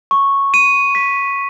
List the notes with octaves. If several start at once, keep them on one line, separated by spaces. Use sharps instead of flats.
C#6
D#7
B6